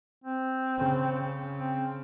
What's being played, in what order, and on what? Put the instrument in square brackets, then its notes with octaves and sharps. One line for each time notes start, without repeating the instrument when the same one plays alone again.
[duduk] C4
[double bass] C#3
[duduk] C4